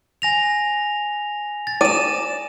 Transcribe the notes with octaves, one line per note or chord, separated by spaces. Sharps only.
G#5 A#6 F7
A6
D5 D#7 E7